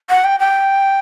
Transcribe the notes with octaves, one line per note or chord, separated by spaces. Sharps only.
F#5
G5
G5